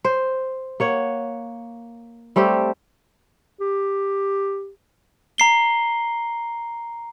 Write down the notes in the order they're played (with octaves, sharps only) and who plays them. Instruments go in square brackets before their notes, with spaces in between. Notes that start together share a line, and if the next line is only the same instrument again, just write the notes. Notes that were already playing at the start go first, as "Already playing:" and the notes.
[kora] C5
A#3 C#5 F#5
G3 A3 C4 G4
[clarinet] G4
[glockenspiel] A#5 C7 G7